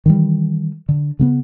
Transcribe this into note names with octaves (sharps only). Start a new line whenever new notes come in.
D#3 E3 G3
D3
C#3 A#3 B3